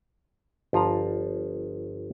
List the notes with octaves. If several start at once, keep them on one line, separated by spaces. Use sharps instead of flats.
G1 F3 F4 A#5